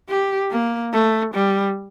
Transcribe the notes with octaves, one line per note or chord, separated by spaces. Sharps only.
G4
A#3
A3
G3